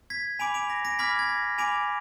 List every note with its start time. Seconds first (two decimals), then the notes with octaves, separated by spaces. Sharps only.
0.10 G#6 B6
0.39 G#5 B5 D6 D7 F7
0.54 D7 F7
0.70 A#6
0.85 A#6 D7
0.99 B5 D6 F6 G#6 B6
1.19 G#6
1.29 A#6
1.58 G#5 B5 D6 D7 F7